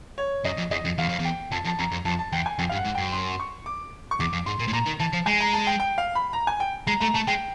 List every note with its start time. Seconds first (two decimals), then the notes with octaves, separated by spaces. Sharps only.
0.18 C#5
0.45 F#2 D#5
0.58 F2
0.71 E2 D#5
0.85 F2
0.98 E2 F5
1.09 F2
1.19 E2
1.25 G5
1.52 F2 A5
1.65 F2 A5
1.79 F2 A#5
1.92 F2
2.05 F2 A5
2.19 A5
2.32 E2 G5
2.46 G#5
2.59 F2 G5
2.69 F5
2.72 G2
2.77 F#5
2.85 G#2
2.95 F#2 G5
3.13 C6
3.40 C#6
3.66 D6
4.11 C#6
4.20 E2 D6
4.33 F2
4.46 G#2 C6
4.59 A#2
4.68 A2
4.73 A#2 A#5
4.86 D#3
5.00 E3 A5
5.13 F3
5.26 G#3 G#5
5.40 A#5
5.53 A5
5.67 G5
5.80 G5
5.98 F5
6.15 B5
6.33 A#5
6.47 G#5
6.60 G5
6.87 G#3 A#5
7.00 A3 A#5
7.14 A3 A5
7.27 G#3 G5